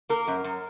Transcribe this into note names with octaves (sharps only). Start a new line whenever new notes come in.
A#3 A#4
F#2
F#2